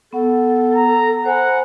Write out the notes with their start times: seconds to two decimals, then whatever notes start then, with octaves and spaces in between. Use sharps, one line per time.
0.13 B3 A4 F#5
0.76 A#5
1.25 C5 F#5 G#5 B5